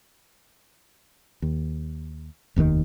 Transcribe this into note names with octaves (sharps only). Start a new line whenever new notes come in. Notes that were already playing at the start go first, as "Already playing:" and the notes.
D#2
F1 D#2 A2 D#3